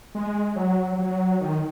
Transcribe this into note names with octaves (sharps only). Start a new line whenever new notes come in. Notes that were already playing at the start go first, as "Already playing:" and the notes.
G#3
F#3
F#3
D#3